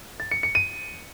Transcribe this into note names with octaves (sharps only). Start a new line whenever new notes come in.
A6
C#7
C#7
D#7